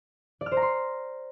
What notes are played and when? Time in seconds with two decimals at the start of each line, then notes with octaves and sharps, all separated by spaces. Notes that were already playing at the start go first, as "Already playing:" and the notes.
0.41 D5
0.46 F6
0.51 C5
0.57 A#5
0.62 C6